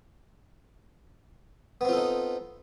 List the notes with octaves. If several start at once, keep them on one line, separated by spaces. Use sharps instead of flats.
B3 C4 D#4 F4 A4